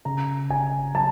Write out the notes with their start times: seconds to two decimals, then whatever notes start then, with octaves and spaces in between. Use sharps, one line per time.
0.05 C#3 A#5
0.50 G1 G#5
0.94 F#3 A5